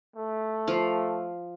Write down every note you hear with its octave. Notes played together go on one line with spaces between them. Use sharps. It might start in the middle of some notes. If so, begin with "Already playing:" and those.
A3
F3 F5